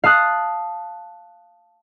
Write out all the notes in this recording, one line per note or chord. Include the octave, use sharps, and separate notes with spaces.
F5 A5 D#6 F#6